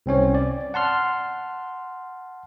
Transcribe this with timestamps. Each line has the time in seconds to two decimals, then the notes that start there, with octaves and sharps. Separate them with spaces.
0.06 C2 C4 C#4 C#5
0.35 D5
0.74 F#5 A5 C6 F6